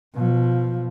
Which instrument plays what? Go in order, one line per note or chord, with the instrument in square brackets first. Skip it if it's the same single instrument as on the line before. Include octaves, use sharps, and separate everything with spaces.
[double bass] B2 F3